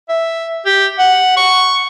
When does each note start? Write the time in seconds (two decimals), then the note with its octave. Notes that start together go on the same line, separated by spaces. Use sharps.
0.09 E5
0.66 G4
0.99 F#5
1.37 C#6